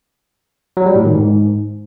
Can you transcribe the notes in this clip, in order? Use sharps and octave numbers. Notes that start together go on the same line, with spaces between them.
F#3
G3
A2
D#3
G#2